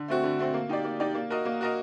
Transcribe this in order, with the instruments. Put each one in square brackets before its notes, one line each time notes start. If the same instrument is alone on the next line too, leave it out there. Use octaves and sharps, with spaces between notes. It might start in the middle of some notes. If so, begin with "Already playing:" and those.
Already playing: [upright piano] D3
A3 C4 F#4
D3
A3 C4 F#4
A#3
D#4 G4 D5
A#3
D#4 G4 D5
A#3
F#4 A#4 D#5
A#3
F#4 A#4 D#5